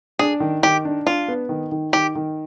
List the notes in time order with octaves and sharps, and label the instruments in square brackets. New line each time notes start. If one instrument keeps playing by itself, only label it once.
[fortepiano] D4 [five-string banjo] G#4
[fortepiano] D#3
[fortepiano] D#3 [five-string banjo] G4
[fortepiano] D4
[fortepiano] D4 [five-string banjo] F4
[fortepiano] B3
D#3
D#3
[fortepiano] D#3 [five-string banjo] G4
[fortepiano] D#3